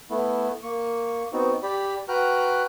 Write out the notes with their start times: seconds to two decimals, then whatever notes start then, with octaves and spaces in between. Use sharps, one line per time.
0.10 A3 B3 E4
0.63 A#3 C#6
1.33 B3 C4 D#4 F#4
1.63 G4 D5 B5
2.08 F#4 B4 G5 A#5 F6 F#6